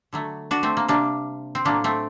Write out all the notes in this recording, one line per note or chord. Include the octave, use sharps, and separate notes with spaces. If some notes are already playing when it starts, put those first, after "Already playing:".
D3 F#3 A3
D4 F#4
A3 C4
A#3
C3 G3 A#3 D4
C4
A2 F#3 A3 A#3 D4
A3 C4